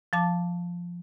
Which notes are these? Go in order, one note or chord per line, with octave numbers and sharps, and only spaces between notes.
F3 F5 A5 D6